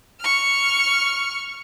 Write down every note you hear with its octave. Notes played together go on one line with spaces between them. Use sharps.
C#6 F6